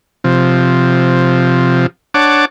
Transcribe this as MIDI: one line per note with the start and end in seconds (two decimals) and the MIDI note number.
0.24 1.87 48
0.24 1.87 53
2.14 2.45 62
2.14 2.45 73
2.14 2.45 78
2.14 2.45 81
2.14 2.45 86